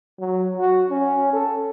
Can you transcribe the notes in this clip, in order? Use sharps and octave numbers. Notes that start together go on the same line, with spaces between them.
F#3
F#4
C#4
A4